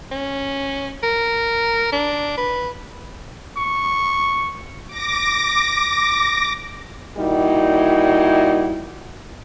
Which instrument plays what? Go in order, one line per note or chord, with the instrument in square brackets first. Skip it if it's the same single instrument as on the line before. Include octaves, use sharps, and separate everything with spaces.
[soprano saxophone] C#4
A#4
D4
B4
[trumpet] C#6
[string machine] D6 A#6
[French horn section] A#2 G3 D#4 E4 F#4